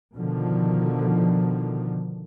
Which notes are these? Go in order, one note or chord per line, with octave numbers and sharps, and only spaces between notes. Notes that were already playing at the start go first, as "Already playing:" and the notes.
B2 D3 D#3 F3